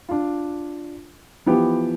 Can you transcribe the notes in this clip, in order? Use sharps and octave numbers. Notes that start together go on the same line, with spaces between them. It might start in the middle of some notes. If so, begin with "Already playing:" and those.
D4 F4
E3 F3 B3 G4